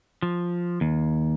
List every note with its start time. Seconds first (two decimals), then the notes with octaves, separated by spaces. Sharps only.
0.22 F3
0.81 D#2